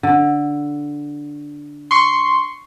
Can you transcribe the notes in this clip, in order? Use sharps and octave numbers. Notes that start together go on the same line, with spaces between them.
D3
C6 C#6